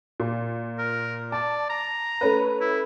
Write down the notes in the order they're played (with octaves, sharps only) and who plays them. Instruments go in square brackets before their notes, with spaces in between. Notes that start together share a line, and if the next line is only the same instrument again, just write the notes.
[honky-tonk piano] A#2
[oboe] A#4
[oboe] D5 [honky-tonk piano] A5
[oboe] A#5
[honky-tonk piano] A3 C#4 B4
[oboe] E4